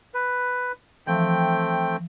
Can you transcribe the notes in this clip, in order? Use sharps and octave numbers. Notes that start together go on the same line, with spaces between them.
B4
E3 F3 A3 C4 G5